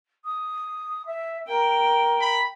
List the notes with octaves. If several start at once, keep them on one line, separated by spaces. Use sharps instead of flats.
D#6
E5
A#4 G5
B5